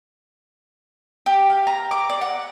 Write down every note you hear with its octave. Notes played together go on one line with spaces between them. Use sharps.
G4
F5
A#5
D6
D5
F#5